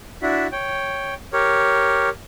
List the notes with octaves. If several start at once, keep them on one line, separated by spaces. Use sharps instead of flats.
D4 E4 F#4 E5
C#5 G5
G4 A#4 C#5